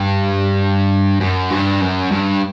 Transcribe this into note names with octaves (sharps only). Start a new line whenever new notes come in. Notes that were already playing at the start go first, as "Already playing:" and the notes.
Already playing: G2
F#2
G2
F#2
G2